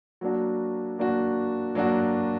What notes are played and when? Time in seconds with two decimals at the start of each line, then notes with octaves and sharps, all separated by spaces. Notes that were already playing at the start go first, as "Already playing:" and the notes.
0.21 F#3 A#3 D4 F#4
0.98 F#3 A#3 D4 F#4
1.75 F#3 A#3 D4 F#4